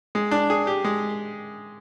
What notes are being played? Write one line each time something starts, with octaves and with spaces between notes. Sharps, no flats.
G#3
D4
G#4
G4
G#3